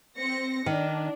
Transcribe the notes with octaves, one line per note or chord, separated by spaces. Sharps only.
C4 A#6 C#7
D#3 D4